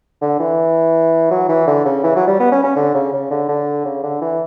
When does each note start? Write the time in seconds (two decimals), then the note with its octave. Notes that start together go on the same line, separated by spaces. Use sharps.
0.21 D3
0.39 E3
1.31 F#3
1.49 E3
1.67 D3
1.85 C#3
2.03 E3
2.16 F#3
2.28 G3
2.39 B3
2.52 C#4
2.63 C#4
2.76 D3
2.94 C#3
3.13 C#3
3.30 D3
3.48 D3
3.85 C#3
4.03 D3
4.21 E3